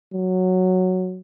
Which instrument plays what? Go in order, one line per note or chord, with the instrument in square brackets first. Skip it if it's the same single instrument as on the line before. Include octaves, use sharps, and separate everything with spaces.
[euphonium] F#3